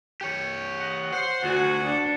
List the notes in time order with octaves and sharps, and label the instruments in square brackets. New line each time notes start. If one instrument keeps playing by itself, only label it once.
[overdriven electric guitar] G4 C#5
[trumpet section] D#5 F#5
[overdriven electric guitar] C5 [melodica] F#5 [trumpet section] C6
[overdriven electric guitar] D2 [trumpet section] E4 G#4 [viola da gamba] F#4
[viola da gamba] D4 [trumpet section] A4 B4 C#6